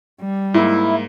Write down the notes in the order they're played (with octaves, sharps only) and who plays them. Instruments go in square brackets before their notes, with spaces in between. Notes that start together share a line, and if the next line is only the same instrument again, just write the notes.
[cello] G3
[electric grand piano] G#2 A#3 [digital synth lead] E4